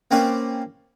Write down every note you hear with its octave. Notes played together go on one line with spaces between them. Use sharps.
A#3 C4 C#4 B4 D5